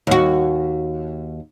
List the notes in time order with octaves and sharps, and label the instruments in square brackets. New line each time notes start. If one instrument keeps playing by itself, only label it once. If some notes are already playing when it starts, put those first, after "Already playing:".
[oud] D#2 F#4